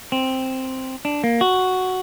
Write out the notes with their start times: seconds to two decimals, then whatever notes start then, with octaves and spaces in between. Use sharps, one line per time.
0.12 C4
1.05 D4
1.24 A#3
1.41 F#4